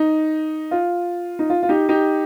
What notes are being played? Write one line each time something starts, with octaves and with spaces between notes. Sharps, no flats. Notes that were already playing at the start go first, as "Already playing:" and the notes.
Already playing: D#4
F4
D#4
F4
F4
D#4 G4
D#4 G4